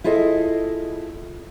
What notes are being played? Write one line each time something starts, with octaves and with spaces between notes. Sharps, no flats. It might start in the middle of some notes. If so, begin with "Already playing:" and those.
E4 F4 G#4 A4 D#5